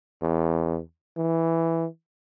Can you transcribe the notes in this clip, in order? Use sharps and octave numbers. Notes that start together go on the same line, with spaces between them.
E2
E3